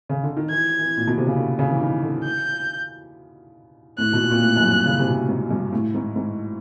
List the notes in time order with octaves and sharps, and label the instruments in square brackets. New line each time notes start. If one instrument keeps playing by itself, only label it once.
[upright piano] C#3
D3
D#3
[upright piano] E3 [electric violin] G#6
[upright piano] E3
A#2
B2
C3
C#3
D3
C#3
E3
D#3
D3
[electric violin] G6
[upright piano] A2 [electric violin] F#6
[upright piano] B2
A#2
A#2
A2
F#2
G2
C#3
C3
B2
G#2
G2
A2
G#2
G#2